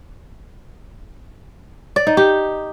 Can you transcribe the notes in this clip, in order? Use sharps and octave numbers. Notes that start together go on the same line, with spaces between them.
D5
D#4
G4